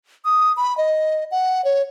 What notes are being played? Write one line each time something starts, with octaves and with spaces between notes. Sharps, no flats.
D#6
B5
D#5
F#5
C#5